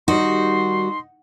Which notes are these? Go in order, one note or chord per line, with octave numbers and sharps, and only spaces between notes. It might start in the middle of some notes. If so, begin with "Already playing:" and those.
D#3 G3 D#4 F#4 C6